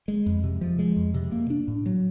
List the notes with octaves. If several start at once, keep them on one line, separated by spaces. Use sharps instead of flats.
G#3
F2
C3
F3
G#3
F2
C3
A#3
D4
A2
F#3